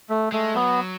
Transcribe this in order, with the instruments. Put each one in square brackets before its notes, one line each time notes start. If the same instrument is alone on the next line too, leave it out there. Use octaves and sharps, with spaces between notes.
[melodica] A3
[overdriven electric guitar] G#3 [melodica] A3
[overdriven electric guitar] F#3 [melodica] B3